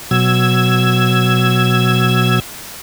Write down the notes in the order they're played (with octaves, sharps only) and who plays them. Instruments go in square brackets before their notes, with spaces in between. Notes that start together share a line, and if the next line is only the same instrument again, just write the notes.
[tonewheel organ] B2 F#3 E6 G#6